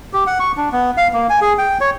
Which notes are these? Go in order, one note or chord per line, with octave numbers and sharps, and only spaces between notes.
G4
F#5
C#6
D4
B3
F5
A#3
G#5
G#4
G5
C#5